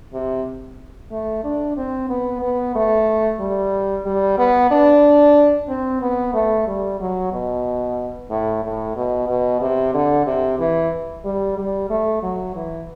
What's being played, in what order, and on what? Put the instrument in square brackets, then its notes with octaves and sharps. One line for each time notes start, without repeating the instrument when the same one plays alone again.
[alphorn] C3
A3
D4
C4
B3
B3
A3
G3
G3
B3
D4
C4
B3
A3
G3
F#3
B2
A2
A2
B2
B2
C3
D3
C3
E3
G3
G3
A3
F#3
E3